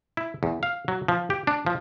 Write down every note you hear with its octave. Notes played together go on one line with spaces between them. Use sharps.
E4
E2
F5
F#3
F3
G4
D4
F3